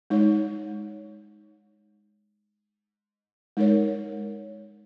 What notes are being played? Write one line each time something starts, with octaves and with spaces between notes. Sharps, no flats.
G#3 D#4 C#5
G#3 D#4 A#4 C#5